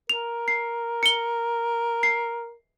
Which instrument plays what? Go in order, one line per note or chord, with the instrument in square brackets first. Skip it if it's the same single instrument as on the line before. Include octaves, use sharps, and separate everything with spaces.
[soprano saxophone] A#4 [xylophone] F7
[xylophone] C7
C#7 G7
C7